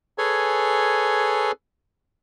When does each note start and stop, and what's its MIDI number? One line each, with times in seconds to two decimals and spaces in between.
0.18 1.52 68
0.18 1.52 69
0.18 1.52 71
0.18 1.52 73
0.18 1.52 80